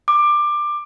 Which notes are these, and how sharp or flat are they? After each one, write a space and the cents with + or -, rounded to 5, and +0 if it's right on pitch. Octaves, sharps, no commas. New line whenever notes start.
D6 +20